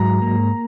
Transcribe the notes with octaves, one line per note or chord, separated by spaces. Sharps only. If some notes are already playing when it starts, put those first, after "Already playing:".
Already playing: G#2 F#3 A#5
A#3